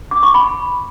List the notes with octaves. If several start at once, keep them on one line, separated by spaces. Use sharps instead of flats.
D6
C#6
B5